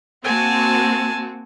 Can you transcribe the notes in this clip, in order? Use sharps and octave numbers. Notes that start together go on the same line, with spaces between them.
A#3 C4 F#4 G#5 A5